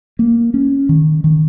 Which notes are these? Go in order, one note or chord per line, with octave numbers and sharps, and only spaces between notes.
A#3
C#4
D#3
D#3